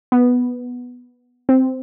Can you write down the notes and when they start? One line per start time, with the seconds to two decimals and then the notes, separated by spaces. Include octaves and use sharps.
0.12 B3
1.49 C4